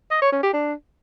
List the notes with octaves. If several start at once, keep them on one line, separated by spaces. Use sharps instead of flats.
D#5
C#5
C#4
G4
D4